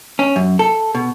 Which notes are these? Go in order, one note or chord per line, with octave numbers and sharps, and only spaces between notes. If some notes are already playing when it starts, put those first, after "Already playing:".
C#4
F#2
A4
B2